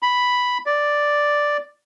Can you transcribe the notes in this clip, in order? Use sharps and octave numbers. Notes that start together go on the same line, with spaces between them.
B5
D5